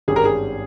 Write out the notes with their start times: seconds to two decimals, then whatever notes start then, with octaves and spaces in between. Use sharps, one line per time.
0.08 G#1 G2 G3 C#4 G4 G#4
0.16 A#4
0.25 G#4